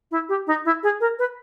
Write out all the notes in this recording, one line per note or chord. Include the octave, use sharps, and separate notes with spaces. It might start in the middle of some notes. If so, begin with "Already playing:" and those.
E4
G4
D#4
E4
G#4
A#4
B4